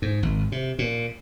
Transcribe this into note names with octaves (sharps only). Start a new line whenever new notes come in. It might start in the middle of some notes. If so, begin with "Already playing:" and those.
G#2
G#1
C3
A#2